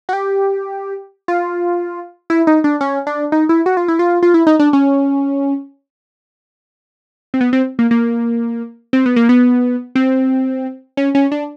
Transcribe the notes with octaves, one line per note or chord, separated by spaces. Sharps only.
F#4
G4
F4
E4
D#4
D4
C#4
D4
D#4
E4
F#4
F4
E4
F4
F4
E4
D#4
D4
C#4
C4
B3
C4
A#3
A#3
C4
B3
A#3
B3
C4
C#4
C#4
D4